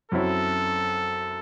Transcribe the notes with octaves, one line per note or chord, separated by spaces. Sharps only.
F#2 F#3 C4 E4 A4